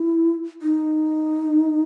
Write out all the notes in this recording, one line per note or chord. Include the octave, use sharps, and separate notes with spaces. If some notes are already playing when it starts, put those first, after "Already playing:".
Already playing: E4
D#4